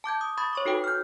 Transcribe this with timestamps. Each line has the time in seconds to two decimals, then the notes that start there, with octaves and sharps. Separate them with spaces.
0.04 A5 D6 G6 G#6
0.21 D#6
0.38 B5 C#6 D#6 G#6 A6
0.53 C#5 C#6 D6
0.65 D#4 F#4 A4 B4 G5
0.84 F6 G6